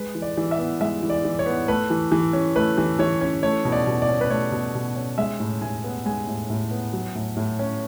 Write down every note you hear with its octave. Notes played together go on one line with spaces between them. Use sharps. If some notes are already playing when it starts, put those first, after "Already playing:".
Already playing: G#3 B4
E3
D5
E3
E5
B3
G#3 E5
E3
D5
E3
C#5
B3
A3 B4
E3
E3
C#4
A3 B4
E3
E3 C#5
C#4
A3 C#5
B2
D5
B2
D5
C#4
B4
A3 C#5
B2
B2
C#4
G#3 E5
A2
A2 G#5
B3
G#3 G#5
A2
A2
B3
F#3
A2
A2
C#4